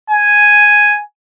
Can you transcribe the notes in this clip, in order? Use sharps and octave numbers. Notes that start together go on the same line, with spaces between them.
G#5